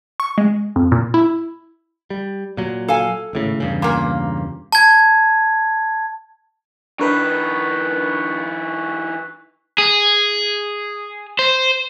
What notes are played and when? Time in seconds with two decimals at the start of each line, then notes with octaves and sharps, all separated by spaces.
0.20 C#6
0.38 G#3
0.76 F2
0.92 A#2
1.14 E4
2.10 G3
2.57 A#2 F#3
2.88 A4 F5 G#5
3.33 G#1 A2 C#3
3.60 E2 G2 C#3
3.82 A#2 A#3
4.72 A5 G#6
7.00 E3 D4 D#4 A#4 B4 C#6 F#6 B6
9.78 G#4
11.39 C5